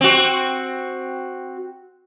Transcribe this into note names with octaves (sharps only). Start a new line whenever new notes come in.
C4 F#4